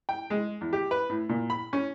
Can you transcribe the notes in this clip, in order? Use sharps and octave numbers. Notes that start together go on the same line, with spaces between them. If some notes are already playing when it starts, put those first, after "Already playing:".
G5
G#3
E2
G4
B4
A2
A#2
B5
C#4